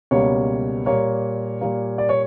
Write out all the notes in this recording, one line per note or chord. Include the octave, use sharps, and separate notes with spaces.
C#2 B2 G3 A#3 C#5
A#2 G3 A#3 C#5
A#2 G3 A#3
D5
C#5